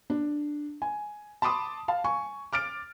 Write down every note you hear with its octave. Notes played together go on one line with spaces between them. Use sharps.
D4
G#5
A5 B5 C6 D6 D#6
F5 A5
G#5 C#6
D6 F6 A6 D7